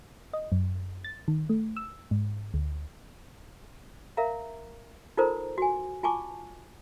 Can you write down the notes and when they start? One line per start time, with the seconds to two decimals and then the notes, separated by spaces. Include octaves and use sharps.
0.33 D#5
0.52 F#2
1.04 A6
1.28 D#3
1.49 A3
1.77 E6
2.11 G#2
2.54 D2
4.17 A#4 E5 F5 A#5
5.17 D#4 F4 A4 A#4 C5 A#5
5.58 F#4 G#5
6.03 F4 G#5 A5 C#6 D6